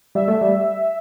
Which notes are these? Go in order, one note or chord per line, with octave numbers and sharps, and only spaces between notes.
G3 E5
A3
G3